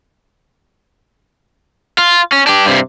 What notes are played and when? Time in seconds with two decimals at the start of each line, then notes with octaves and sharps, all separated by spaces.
1.98 F4
2.32 C#4
2.47 D4 G4
2.65 G2 C3